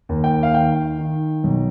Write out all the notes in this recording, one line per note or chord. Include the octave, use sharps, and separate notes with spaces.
D#2
G5
F5
D#3 G5
D#3
B1